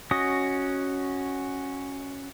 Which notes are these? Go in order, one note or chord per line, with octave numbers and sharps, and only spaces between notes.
C#4 F#4 D#5